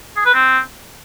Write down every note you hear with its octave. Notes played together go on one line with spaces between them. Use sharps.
G#4
B4
C4